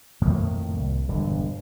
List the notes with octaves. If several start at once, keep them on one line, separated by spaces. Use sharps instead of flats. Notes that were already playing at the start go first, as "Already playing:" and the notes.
F2 A2 D#3 A#3
C2
E1 G2 D3